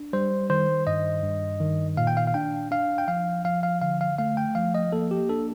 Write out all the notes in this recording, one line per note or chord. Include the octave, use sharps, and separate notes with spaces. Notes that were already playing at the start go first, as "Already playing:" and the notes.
Already playing: D4
G3 C5
D#3 C5
G2 D#5
G2
D#3
A#2 F5
G5
F5
F5
D4 G5
D4 F5
G5
F3 F5
F3 F5
F5
D3 F5
F5
A3 F5
G5
F3 F5
D#5
A#3 A4
G4
D4 A4